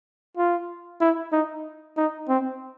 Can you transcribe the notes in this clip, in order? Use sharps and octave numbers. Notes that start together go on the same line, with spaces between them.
F4
E4
D#4
D#4
C4